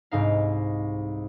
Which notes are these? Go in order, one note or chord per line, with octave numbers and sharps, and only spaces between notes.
C2 G#2 D#4 F5